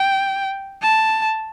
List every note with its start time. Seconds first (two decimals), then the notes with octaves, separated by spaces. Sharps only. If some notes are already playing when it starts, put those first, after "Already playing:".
Already playing: G5
0.81 A5